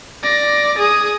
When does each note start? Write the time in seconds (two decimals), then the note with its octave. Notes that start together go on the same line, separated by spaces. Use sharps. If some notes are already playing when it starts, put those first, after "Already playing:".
0.23 D5 A#6
0.78 G#4 D#6